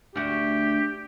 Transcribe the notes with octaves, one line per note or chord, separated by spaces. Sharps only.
D2 F#4 G4